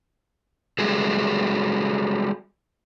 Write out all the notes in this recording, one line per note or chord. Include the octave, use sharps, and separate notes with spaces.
G3 G#3 F#4 G#4 A4